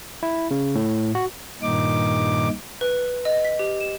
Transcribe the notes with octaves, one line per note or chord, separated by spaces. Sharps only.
E4
C#3
A2
F#4
G2 A#2 D#3 D#4 D6
B4
D#5
B6
G4
E7